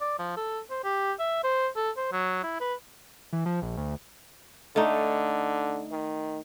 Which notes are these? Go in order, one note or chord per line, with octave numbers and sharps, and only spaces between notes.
D5
F3
A4
C5
G4
E5
C5
A4
C5
F#3
E4
B4
E3
F3
A#1
D2
D3 A3 D#4
D#3